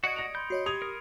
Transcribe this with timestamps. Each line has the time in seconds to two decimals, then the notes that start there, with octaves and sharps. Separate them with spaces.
0.04 F#4 D5 D#5 F#5 D#6 G#6 C#7 D7
0.16 A#6 F7
0.35 B5 C6 G6
0.50 F#4 C#5 D#5 C7
0.66 G4 D#6 G#6 F7
0.82 A#4